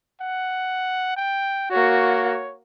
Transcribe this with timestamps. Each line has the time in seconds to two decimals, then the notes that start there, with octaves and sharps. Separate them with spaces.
0.21 F#5
1.17 G5
1.71 A#3 F#4 C#5